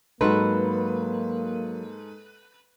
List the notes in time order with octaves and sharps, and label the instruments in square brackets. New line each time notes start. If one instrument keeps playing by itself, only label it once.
[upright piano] G#2 A4 C6 [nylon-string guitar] F#3 D#4 F#4 [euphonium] A#3 [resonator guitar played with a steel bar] B4